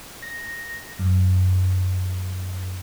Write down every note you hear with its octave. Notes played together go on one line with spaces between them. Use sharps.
A#6
F#2